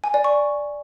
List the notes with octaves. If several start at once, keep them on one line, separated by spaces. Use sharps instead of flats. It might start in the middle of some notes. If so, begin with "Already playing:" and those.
G#5
D5
C#6